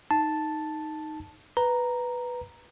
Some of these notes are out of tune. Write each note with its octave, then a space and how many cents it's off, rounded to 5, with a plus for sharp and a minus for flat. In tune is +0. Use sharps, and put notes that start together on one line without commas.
D#4 +0 A5 +0
B4 +0 A#5 +0